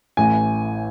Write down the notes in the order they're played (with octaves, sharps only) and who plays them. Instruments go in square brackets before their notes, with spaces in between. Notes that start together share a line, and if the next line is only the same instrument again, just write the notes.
[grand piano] A1 A2 E3 G#5